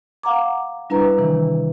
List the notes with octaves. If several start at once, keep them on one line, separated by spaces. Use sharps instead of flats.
F5 F#5 A#5 D6
G3 D4 E4 B4 A#5
C3 D#3 E3